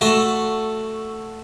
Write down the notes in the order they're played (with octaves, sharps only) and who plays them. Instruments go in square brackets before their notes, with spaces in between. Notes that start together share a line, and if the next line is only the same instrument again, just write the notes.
[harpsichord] A3 F#4 A4 C6